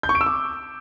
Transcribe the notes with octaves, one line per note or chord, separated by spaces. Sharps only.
G6
C#6
D7
E6
D6